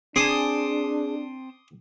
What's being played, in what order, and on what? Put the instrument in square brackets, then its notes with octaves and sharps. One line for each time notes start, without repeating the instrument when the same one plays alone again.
[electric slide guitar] C4 A5 [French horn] D4 [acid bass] G#4 [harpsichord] C6 D6 D#6